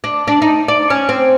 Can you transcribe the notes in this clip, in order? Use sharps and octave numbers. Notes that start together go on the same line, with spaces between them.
D4
D4
D#4
D5
C#4
C4